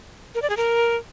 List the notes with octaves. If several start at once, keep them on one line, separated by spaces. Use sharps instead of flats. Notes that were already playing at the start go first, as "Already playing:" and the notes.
A#4
D5
G#4
A#4